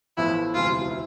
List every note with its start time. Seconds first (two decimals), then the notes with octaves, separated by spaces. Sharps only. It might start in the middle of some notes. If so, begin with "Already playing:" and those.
0.17 A1 A2 F3 B3 E4
0.54 E1 D2 C3 E3 F4
0.90 E4